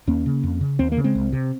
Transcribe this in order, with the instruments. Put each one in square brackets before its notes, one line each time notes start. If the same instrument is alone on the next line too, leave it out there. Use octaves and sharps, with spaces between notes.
[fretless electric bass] D#2 A#3 C#4
C#3
F2
C#3
D#2 C4
A#3
C#3
G#3 C4
C2
C3